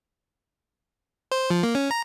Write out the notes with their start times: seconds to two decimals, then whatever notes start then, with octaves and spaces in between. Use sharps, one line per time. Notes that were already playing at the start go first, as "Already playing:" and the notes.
1.32 C5
1.50 F3
1.63 A#3
1.75 C#4
1.91 A#5